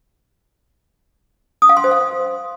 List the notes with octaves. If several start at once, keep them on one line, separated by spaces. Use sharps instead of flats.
D#6
F5
C6
C5
F5